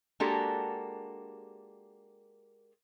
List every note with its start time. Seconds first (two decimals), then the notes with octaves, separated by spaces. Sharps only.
0.20 G#3 A#3 D4 F#4 G4 A4